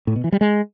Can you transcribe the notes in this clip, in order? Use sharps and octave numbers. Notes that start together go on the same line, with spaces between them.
A2
B2
E3
G3
G#3